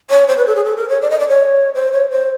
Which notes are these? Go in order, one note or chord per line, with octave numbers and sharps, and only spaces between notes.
C#5
C5
B4
A4
G#4
A4
A#4
C#5
D5
D#5
D5
C#5
C5
C#5
C5